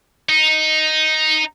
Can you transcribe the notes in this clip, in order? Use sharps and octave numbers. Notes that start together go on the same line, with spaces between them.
D#4